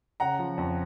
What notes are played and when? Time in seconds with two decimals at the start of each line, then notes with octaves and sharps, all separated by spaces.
0.20 C#3 F#5 A#5
0.39 F3
0.57 F2